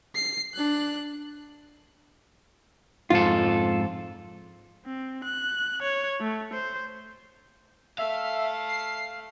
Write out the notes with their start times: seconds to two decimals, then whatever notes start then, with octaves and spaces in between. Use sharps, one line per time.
0.15 C7
0.54 D4 F#6
3.10 F2 G#2 F4 A4
4.85 C4
5.24 F#6
5.82 C#5
6.20 A3
6.53 C5
7.98 A3 E5 F5
8.68 C7